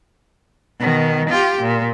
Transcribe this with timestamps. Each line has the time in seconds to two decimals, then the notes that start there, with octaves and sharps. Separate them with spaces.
0.79 B2 D#3
1.29 F4 G4
1.61 A#2